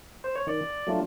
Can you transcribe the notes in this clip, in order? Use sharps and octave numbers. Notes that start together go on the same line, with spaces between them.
C5
C#5
D#3 D5
F#3 A3 D4 F4